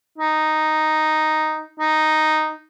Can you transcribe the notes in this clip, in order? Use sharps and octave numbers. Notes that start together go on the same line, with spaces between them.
D#4
D#4